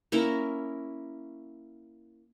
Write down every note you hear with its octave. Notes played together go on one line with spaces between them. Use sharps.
A#3 C#4 E4 A#4